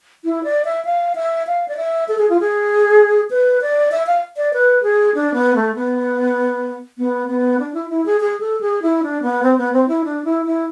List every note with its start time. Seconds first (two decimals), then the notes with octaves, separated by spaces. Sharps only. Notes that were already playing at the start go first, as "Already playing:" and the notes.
0.25 E4
0.44 D5
0.65 E5
0.85 F5
1.16 E5
1.47 F5
1.68 D5
1.77 E5
2.08 A4
2.18 G#4
2.30 F4
2.40 G#4
3.31 B4
3.62 D5
3.92 E5
4.07 F5
4.37 D5
4.54 B4
4.83 G#4
5.15 D4
5.34 B3
5.56 A3
5.75 B3
6.98 B3
7.28 B3
7.60 D4
7.74 E4
7.90 E4
8.06 G#4
8.20 G#4
8.40 A4
8.61 G#4
8.82 E4
9.03 D4
9.23 B3
9.43 C4
9.58 B3
9.73 C4
9.88 E4
10.04 D4
10.25 E4
10.46 E4